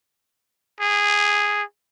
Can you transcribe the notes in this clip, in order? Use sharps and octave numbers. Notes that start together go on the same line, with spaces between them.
G#4